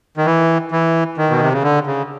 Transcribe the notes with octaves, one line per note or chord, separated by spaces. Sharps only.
D#3
E3
E3
D#3
B2
C3
C#3
D3
C#3